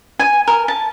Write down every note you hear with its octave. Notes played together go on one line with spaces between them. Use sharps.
G#5
A#4
A5